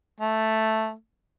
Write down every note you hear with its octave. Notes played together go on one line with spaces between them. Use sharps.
A3